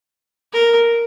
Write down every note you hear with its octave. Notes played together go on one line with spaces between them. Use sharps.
A#4